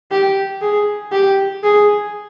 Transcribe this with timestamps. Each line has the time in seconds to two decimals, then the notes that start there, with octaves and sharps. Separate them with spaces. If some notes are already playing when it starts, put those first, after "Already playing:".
0.11 G4
0.62 G#4
1.12 G4
1.63 G#4